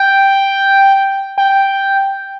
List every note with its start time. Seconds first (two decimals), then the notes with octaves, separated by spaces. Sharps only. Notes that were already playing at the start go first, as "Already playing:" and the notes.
Already playing: G5
1.38 G5